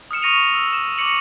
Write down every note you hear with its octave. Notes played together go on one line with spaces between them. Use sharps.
D#6 F6 C#7 E7
C#6 A#6 D#7 F7
E6
E7
C#6 D6 A#6 C#7 F#7